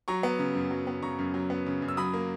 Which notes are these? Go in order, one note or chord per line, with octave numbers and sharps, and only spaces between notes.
F#3 A#5 C#6
B3
C#3
F#2
F#3
B3
C#3 A#5 C#6
F#2
F#3
B3
C#3
F#2
E6
F#3 B5 D#6
A#3